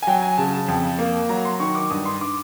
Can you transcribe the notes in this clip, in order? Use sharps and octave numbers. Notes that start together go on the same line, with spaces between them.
G#5
F#3 G5
G#5
C#3 A5
A5
F2
A#3
F#3 A#5
C6
D#3 C#6
D6
G2 D#6
C6
D6